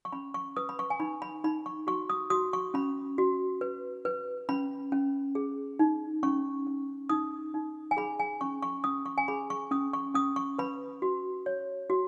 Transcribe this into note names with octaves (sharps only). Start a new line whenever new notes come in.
C#6
C#4 B5
C#6
B4 D#6
B5
C#6
G#5
D#4 B5
B5
D#4 B5
C#6
F#4 C#6
D#6
F#4 D#6
C#6
C#4 B5
F#4
B4
B4
C#4 B5
C#4
G#4
D#4
C#4 C#6
C#4
D#4 D#6
D#4
G#5
G#4 B5
G#5
C#4 C#6
C#6
C#4 D#6
C#6
G#5
G#4 B5
C#6
C#4 D#6
C#6
C#4 D#6
C#6
B4 B5
F#4
C#5
F#4